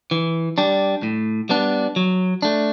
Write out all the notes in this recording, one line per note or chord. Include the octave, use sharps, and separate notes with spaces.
E3
G3 D4
A2
G3 B3 D4
F#3
A3 D4